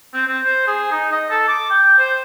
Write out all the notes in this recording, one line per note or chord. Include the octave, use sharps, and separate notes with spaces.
C4
C4
C5
G#4
D#4
D#5
A4
D6
G5
C5